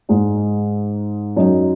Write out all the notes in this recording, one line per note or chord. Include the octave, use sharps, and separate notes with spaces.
G#2 G#3 D#4
F#2 F#3 D#4